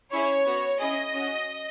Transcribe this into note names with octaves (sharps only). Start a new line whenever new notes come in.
C#4 E4 G#4 C#5
B3 F#4
C#4 E4 G#4 D#5
C#4 F#4